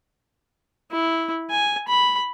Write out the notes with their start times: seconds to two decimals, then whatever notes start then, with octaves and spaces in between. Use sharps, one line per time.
0.91 E4
1.50 G#5
1.88 B5